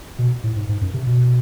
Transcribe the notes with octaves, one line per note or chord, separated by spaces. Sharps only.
B2
A2
G#2
G#2
F#2
C3
B2